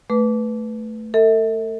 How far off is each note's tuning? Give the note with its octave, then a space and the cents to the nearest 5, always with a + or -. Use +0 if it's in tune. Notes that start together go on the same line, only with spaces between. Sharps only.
A3 +0 B4 +0 D6 -25
A4 +40 E5 -35